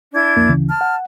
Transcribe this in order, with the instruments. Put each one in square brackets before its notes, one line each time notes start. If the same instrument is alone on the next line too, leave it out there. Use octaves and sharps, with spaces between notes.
[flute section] D4 E4 G#6
[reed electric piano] C2 F2 A#3
D2 C#3 E3
[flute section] A5 F6
[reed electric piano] F#5